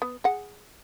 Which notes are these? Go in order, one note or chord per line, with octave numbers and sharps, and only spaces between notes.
B3
G#4 F#5